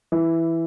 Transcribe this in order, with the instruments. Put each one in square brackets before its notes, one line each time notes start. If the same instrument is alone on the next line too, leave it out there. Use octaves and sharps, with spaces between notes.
[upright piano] E3